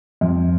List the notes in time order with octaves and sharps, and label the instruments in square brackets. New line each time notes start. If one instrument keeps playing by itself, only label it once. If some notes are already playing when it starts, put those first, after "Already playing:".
[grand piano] F2